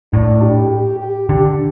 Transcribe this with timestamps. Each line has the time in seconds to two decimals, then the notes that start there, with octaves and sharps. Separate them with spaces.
0.13 A2 D4
0.42 G4
0.71 G4
1.00 G4
1.29 D3 G4